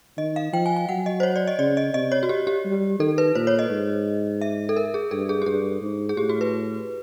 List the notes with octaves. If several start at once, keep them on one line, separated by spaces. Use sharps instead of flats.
D#3 D#5
F5
F3 G5
G#5
G#5
F#3 F#5
D#5
C5
C#5
D5
D#5
C#3 D5
D#5
C3 D#5
C#5
F#4
G4
G4
G3
D#3 A4
B4
A#2 C5
C#5
D#5
G#2
E5
A4
A#4
G#4
G2 A4
G#4
G4
G2 G#4
G#2
G#4
A2 G4
F#4
B4